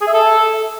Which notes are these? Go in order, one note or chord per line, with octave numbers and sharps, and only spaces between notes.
G#4
E5
A4